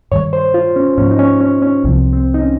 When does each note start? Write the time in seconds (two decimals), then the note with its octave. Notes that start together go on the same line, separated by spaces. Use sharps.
0.11 G2 D#3 G3 C#5
0.33 C5
0.54 F4
0.76 C#4
0.97 G#2 F3 A#3 C#4
1.11 D#4
1.19 C#4
1.41 C#4
1.62 C#4
1.84 C2 C3 F3 C4
2.13 C4
2.34 D#4
2.42 C#4